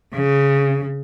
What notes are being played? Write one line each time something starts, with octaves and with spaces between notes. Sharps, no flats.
C#3